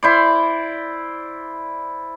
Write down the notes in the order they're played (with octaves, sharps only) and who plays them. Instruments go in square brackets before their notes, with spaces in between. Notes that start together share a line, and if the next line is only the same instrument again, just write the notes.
[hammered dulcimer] E4 C5 D5